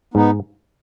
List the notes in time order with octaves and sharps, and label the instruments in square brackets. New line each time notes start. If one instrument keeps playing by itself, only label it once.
[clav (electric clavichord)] G#2 [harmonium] B3 D#4